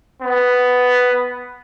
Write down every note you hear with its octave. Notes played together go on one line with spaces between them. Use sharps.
B3